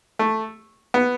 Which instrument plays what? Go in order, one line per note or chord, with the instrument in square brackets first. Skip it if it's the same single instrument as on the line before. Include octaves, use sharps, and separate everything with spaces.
[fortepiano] A3
B3